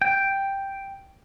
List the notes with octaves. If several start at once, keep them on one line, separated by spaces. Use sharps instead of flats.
G5